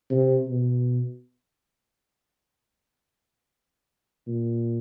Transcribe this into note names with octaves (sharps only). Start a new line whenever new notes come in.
C3
B2
A#2